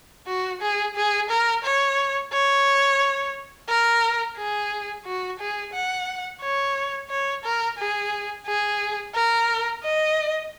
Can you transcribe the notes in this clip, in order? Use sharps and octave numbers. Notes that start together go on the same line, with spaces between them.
F#4
G#4
G#4
A#4
C#5
C#5
A#4
G#4
F#4
G#4
F#5
C#5
C#5
A#4
G#4
G#4
A#4
D#5